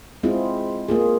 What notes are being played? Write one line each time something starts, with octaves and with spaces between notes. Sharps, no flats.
G#3 C4 E4 F4 G#4
A#3 F4 G#4